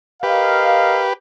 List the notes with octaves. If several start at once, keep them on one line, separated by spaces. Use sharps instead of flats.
G4 A#4 B4 D#5 F5